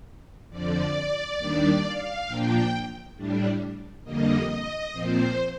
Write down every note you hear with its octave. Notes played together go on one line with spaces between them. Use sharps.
F2 D3 F3 D5
D#2 D#3 G3 D4
F5
A#2 F3 A#3 D4 G5
A2 G3 D4
F2 D3 G3 A#3 D#5
D#5
A#2 F3 C4 C5